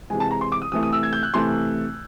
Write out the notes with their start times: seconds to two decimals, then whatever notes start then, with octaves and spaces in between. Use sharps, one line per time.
0.10 C3 E3 G#3 G#5
0.20 A5
0.31 A#5
0.41 C6
0.52 D6
0.62 D#6
0.72 C3 E3 A3 D#6
0.83 D#6
0.93 E6
1.03 G#6
1.13 G6
1.23 F#6
1.34 C3 E3 A3 C6